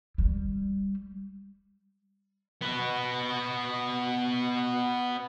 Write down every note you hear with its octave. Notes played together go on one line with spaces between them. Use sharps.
G3
B3 F#4